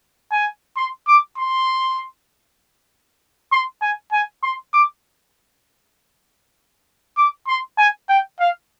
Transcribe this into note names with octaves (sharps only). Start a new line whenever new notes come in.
G#5
C6
D6
C6
C6
G#5
G#5
C6
D6
D6
C6
G#5
G5
F5